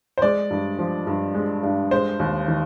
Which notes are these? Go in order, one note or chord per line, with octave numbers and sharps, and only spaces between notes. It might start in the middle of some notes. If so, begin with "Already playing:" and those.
C5
G#3 D5
G2
F3
G2
G#3
G2
G#3 C5
D#2
D#3